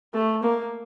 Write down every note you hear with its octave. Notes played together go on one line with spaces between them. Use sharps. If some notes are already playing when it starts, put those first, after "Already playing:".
A3
A#3